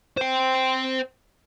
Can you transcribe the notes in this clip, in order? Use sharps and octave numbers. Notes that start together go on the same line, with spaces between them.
C5 G5